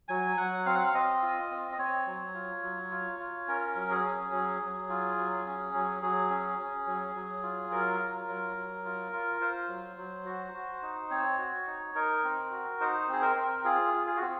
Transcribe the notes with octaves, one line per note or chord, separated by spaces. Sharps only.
F#3 G#5
F#3 F#5
C4 F5
F#5
F5
C4 D#5
F4
C4
D#5
C4 C#5
F#3
F4
F#3
F4
F4
C#4 A#4
F#3
G#4
C#4
F#3
F#3
F4
F#3
C#4
F#3
F#3 G#4
C#4
C#4
F#3
F#3
F4
F#3 A#4
F4
F#3
F#3
F4
F4
F4 C5
F#3
F#3
F#4
F#4
D#4
C4 C#5
F#4
D#4
D#4 A#4
C4
F#4
D#4 C5
C4 G#4
A#4
C4
F4 G#4
F4
G#4
F#4
C4